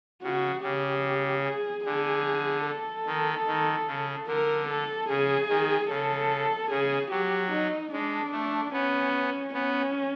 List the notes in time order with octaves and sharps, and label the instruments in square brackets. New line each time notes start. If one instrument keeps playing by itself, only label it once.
[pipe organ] C#3 [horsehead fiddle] F#4
[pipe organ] C#3 [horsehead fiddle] G4
[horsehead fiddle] G#4
[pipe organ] D3 [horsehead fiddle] G#4
[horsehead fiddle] A4
[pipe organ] D#3
D#3
C#3
[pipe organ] D3 [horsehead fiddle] A#4
[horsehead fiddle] A4
[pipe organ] C#3 [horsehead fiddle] G#4
[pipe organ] D#3
[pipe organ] C#3 [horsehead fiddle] A4
[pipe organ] C#3 [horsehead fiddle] G#4
[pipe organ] F#3 [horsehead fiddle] G4
[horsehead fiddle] D#4
[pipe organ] G#3 [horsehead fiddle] D4
[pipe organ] A3
[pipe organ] B3 [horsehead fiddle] C#4
[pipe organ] B3 [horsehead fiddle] C#4